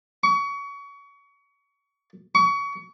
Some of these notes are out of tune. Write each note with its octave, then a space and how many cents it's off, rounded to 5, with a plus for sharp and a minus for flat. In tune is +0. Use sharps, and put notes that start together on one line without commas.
C#6 +30
C#6 +30